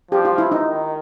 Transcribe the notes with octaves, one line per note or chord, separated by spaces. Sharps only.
F3 G4
F4
E4
D#4
D#3